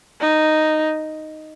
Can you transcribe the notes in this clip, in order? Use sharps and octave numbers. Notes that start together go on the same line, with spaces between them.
D#4